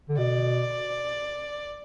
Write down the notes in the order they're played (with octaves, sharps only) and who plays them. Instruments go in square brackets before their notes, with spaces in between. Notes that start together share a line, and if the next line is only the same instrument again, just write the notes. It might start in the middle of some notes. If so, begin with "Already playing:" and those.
[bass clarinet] D3
[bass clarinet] B2 [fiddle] D5